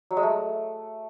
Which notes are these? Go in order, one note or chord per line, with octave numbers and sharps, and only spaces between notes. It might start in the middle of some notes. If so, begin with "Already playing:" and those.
F#3
G#3
A3